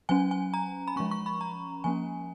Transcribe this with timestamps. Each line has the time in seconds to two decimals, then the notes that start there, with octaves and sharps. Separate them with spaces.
0.09 F#3 C#4 G#5
0.31 G#5
0.54 A#5
0.88 B5
0.96 F3 G#3 C#4 C#6
1.11 C#6
1.26 B5
1.41 A#5
1.84 F3 A#3 C#4 G#5